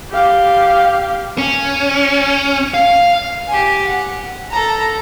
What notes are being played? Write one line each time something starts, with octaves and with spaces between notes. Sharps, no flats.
G4 F5
C#4
F5
G4 G#5
F#5
A4 A#5